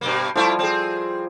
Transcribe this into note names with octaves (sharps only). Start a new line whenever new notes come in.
G2 B2 A#3
F3 G3 A3 E4 F4
C4 G#4